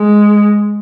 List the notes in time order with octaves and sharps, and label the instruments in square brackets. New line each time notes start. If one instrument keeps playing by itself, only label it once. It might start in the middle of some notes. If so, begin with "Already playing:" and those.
Already playing: [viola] G#3